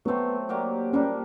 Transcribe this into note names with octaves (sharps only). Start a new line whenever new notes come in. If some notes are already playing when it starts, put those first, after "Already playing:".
F#3 A3 B3 C4
F#3 A#3 D4 G4
A#2 G3 A#3 C#4 D4